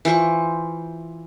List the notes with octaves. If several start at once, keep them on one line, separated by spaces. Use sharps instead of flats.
E3 F4 C5 C#6